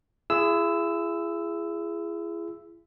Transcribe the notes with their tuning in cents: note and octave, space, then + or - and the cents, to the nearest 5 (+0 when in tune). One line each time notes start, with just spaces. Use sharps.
E4 +40 G#4 +0 E6 +0